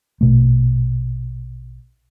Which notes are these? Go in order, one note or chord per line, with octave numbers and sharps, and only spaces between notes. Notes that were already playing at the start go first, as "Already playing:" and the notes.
A#1 B2 A3